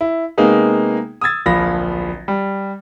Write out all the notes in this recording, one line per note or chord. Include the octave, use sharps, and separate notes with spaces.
E4
C3 G#3 A#3 B3 D#4 G#4
D#6 E6 G#6 A6
D1 A#1 F3 F5 B5 A#6
G3